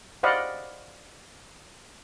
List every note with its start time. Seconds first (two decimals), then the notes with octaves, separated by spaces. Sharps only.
0.23 C5 D5 D#5 F5 F#5 B5